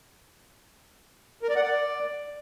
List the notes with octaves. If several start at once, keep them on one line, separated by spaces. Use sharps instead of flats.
A#4
D5
F#5
D5